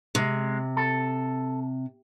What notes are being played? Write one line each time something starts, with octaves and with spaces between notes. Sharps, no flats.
C3 G#3
A4